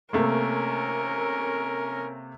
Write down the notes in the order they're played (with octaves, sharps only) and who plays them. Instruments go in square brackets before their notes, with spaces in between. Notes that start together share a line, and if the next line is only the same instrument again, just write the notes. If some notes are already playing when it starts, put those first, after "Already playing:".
[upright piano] C3 A3 A#3 [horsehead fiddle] C#4 A#4